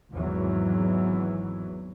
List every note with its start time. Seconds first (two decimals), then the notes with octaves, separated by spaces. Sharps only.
0.12 G#1 E2 G#2 E3 F#3